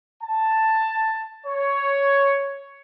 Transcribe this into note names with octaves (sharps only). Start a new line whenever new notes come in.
A5
C#5